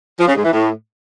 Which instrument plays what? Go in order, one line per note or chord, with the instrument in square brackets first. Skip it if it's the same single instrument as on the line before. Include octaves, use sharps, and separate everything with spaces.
[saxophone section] F3
C#3
G#2
E3
A2